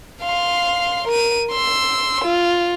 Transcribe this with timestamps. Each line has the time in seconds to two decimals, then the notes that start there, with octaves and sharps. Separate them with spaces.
0.23 F5 C6
1.07 A#4 D#7
1.51 C6 E6
2.24 F4